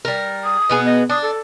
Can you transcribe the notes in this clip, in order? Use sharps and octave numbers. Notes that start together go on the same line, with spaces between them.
G3 A#4
D#6
B2 B3 G#4
D#5
D4 D#6
A4